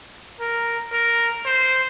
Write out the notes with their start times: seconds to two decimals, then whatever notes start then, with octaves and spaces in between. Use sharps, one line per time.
0.40 A#4
0.93 A#4
1.45 C5